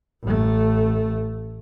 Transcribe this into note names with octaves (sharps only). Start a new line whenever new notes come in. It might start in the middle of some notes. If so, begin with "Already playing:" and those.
A1 A3